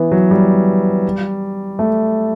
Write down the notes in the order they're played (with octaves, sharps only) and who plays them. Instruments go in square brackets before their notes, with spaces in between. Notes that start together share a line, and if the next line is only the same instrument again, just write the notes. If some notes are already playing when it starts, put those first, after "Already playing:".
Already playing: [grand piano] E3 B3
F#3
G3
A3